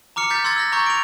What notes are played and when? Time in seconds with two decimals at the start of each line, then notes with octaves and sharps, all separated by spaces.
0.16 A#5 D6 F6 C#7
0.30 A#5 F6 G6 A6 B6
0.44 C6 E6 F6 G#6 A6
0.56 E6 F6 A#6
0.72 A#5 C6 C#6 F6 G6 A6
0.86 D7 F7